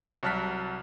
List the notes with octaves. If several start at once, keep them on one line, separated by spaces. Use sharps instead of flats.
C2 F#3 A5 F6 F#6 B6